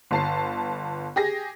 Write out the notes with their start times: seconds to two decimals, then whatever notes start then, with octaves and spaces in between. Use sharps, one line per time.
0.11 G1 A5 C7
1.16 G4 G#4 A#6